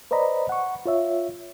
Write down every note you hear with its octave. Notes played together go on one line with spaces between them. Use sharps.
B4 C5 D5 D#5 A#5 B5
F#5 C#6
F4 C#5 E5